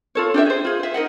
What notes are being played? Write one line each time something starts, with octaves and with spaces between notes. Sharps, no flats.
F4 A4 C#5
D4 G4 C#5 E5
G#4 C5
F4 G#4
C5 E5
D#4 A#4 D#5 F#5